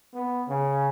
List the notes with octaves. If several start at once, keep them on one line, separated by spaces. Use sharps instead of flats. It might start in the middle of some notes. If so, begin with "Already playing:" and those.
B3
C#3